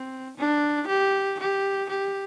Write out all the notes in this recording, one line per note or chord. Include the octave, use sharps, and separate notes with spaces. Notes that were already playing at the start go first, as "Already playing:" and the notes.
Already playing: C4
D4
G4
G4
G4